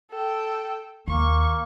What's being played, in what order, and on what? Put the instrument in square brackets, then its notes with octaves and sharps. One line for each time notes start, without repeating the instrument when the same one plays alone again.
[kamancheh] A4 G5
[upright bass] D#2 [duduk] A#3 [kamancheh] C#6